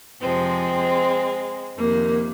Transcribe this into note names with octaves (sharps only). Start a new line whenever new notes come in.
F2 C3 F3 G#3 C4
F2 C3 D#3 A#3